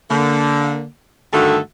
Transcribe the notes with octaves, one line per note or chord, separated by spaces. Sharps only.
D3 A#3
G2 D3 D#3 A3 F#4 A4